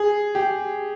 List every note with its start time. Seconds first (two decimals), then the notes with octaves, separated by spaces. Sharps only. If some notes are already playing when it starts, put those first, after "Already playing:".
Already playing: G#4
0.35 G4